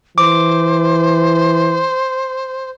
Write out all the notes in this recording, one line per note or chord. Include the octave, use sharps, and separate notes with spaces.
E3 C5 D6